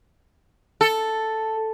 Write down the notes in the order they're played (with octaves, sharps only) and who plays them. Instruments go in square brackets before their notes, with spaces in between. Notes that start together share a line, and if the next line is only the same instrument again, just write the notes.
[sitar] A4